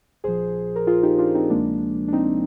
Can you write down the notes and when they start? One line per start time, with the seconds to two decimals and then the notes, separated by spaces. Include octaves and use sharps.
0.24 A#1 A#2 F3 G#4 C5
0.76 A#4
0.87 F4 G#4
1.03 D#4 G4
1.18 D4 F4
1.35 C4 D#4
1.50 D2 C3 F3 G#3 A#3 D4
2.08 D4
2.13 C4 D#4